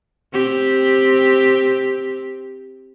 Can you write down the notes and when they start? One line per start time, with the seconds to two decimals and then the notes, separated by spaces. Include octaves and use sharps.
0.33 C4 G4